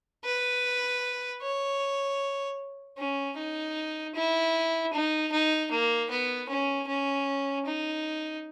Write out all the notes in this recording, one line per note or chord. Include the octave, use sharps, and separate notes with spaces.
B4
C#5
C#4
D#4
E4
D#4
D#4
A#3
B3
C#4
C#4
D#4